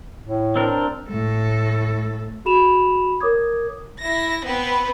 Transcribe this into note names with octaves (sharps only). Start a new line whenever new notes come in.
A2
C4 D4 A#4
A2 A4
F#4 G#4 B5 E7 F7
A#4 C#5 D6 D#6 G#6
E4 A#6
B3 C4 B4